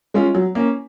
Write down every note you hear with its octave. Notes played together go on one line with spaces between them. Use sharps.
G#3 C#4 F4
F#3
A#3 C#4